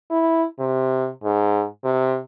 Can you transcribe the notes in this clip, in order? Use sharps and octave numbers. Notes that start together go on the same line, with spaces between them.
E4
C3
G#2
C3